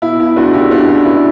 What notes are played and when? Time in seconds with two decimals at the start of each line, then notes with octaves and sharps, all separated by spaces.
0.02 B2 E4
0.20 B2 E4
0.36 C#2 D4 F#4
0.53 C#2 E4 G4
0.70 C#2 D4 F#4
0.87 C#2 E4
1.05 C#2 E4